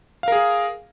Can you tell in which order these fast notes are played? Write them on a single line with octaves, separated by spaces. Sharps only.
F5 A#4 G#4